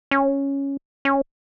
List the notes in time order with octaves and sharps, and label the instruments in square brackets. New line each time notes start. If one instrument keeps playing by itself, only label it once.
[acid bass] C#4
C#4